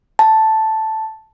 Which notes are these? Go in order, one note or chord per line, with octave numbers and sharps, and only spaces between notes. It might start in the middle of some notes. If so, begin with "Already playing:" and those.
A5